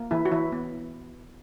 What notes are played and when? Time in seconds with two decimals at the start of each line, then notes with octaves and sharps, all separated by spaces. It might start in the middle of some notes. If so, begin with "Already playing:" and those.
Already playing: A#3
0.11 E3 E4
0.25 F#4
0.32 E3 E4
0.52 B3